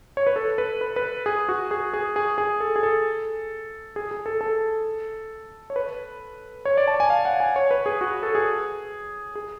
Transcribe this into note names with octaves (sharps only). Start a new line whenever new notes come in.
C#5
B4
A4
B4
B4
B4
G#4
F#4
G#4
G#4
G#4
G#4
A4
G#4
A4
G#4
G#4
A4
A4
C#5
B4
C#5
D5
A5
G#5
F5
F#5
G#5
C#5
B4
G#4
F#4
A4
G#4
G#4